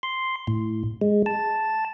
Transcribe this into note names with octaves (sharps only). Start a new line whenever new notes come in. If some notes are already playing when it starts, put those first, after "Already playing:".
C6
A2
G#3
A5